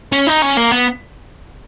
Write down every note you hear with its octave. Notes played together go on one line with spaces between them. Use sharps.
C#4
D#4
C#4
A#3
B3